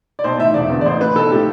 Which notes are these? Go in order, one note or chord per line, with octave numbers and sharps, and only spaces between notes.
D5
B1 C5
A2 E3 E5
E1 D5
E2 D3
D5
A1 C5
A2 E3 B4
B1 A4
A2 F3 G4